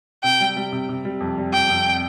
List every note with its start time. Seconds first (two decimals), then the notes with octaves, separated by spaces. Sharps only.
0.24 C3 G5
0.40 G3
0.56 G3
0.72 C3
0.89 C3
1.05 G3
1.21 F2
1.38 G3
1.53 F2 G5
1.70 F2